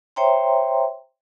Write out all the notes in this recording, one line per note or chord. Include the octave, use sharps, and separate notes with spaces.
C5 C#5 E5 G5 A#5 C6